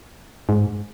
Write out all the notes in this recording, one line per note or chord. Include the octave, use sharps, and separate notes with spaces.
G#2